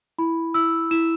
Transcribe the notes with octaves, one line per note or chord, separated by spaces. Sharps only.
E4 B5
E4 E6
E4 E7